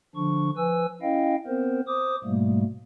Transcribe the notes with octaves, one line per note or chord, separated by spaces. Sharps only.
D3 F3 D4 C#6
F3 B4 G#5 E6
C#4 E4 D#5 F5 G5
B3 C4 A#4 C5
C5 D6 D#6
G#2 B2 G3 A3 A#3